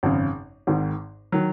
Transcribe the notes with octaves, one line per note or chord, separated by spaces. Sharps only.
G#1 F#2 C#3
G#1 G#2 D#3
D#3 F#3